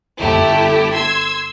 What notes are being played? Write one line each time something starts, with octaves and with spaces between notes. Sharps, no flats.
G1 A3 E4 G4
C6 E6 G#6